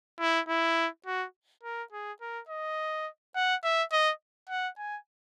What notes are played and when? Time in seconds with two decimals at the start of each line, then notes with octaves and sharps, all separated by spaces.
0.20 E4
0.48 E4
1.06 F#4
1.63 A#4
1.92 G#4
2.21 A#4
2.48 D#5
3.35 F#5
3.63 E5
3.92 D#5
4.49 F#5
4.78 G#5